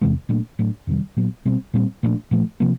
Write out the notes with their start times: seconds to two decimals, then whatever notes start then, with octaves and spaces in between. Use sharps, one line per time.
0.01 E2 C3 E3 G#3
0.29 A#2 F#3 A3 D4
0.59 A2 F#3 A3 D4
0.87 F2 C3 D#3 G3
1.17 A#2 F#3 B3
1.45 B2 G3 C4
1.74 A#2 G3 C4
2.03 A#2 F3 A3 D4
2.31 A#2 F3 A3
2.60 C3 F3 A#3